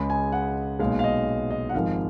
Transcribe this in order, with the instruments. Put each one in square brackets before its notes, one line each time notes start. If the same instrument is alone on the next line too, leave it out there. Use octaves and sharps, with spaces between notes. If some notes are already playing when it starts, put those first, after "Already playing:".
Already playing: [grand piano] C#2 C#3 G#3 B5
G#5
F#5
B1 A#2 G#3 F5
F5
D#5
D#5
F#5
G#1 G#2 F3 G#3 F5